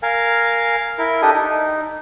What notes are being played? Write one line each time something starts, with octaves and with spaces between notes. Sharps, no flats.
A#4 F5 G#5
E4 A#4
D4 G4 A4 D#5
D#4